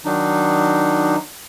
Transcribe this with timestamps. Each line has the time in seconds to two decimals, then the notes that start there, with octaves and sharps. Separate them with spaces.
0.05 D#3 F#3 D4 D#4